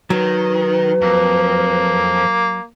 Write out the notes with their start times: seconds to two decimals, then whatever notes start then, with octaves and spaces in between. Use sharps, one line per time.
0.10 D#3 F#3 B4
1.01 F2 A#3